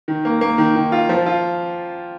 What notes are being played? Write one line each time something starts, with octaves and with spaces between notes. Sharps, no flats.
D#3
A#3
A#3
D#3
D#3
F4
F3
F4